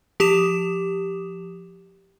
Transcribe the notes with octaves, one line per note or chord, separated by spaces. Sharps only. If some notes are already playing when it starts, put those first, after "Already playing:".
F3 G4 D6 D#6 E7